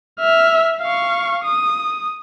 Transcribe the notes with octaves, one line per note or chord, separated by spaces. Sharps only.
E5 F6
F5 C#6
D#6